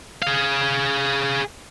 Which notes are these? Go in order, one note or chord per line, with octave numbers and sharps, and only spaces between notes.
G#4 F5